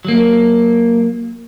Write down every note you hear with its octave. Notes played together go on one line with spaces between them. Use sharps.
F#3 A#3